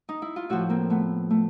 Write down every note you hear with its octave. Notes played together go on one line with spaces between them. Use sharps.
D#4
E4
F4
A2 F3 E4 F#4
A#3 C4
A3 B3
A3